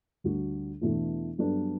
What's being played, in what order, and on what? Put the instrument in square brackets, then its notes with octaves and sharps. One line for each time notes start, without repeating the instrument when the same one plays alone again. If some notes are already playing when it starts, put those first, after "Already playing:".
[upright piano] D2 D3 G3 D4 F#4
E2 B2 A3 D4 F#4
G2 F#3 B3 D4 A4